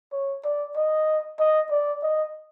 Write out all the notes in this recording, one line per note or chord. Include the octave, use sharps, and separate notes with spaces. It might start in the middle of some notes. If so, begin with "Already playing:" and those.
C#5
D5
D#5
D#5
D5
D#5